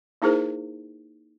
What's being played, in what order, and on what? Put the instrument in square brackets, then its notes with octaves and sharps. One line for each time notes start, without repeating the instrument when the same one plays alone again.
[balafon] A#3 D#4 E4 G#4 A#4 C5